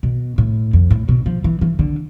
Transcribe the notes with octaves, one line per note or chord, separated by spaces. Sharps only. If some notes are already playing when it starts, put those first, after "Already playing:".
B2
A2
F2
A2
B2
F3
E3
E3
D3